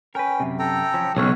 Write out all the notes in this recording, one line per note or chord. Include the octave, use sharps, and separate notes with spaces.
C#4 A#4 B4 G5
F#2 C3
A4 G5 A#5
F3 C#4
B1 C#3 C#5